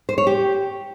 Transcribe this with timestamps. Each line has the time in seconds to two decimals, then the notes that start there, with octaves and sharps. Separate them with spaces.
0.09 C5
0.18 C#5
0.27 G4